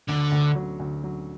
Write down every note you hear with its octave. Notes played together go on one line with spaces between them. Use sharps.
D2 D3
D2
F#3
D2
F#3